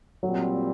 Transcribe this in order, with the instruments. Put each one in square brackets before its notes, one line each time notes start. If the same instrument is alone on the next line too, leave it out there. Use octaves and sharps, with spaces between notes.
[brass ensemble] A#2 G3 C4 [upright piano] F#3